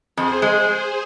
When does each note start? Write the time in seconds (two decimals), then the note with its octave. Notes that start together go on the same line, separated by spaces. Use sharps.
0.17 F2 G#4 C5
0.42 G#3